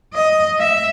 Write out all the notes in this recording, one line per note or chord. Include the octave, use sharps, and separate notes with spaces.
D#5
E5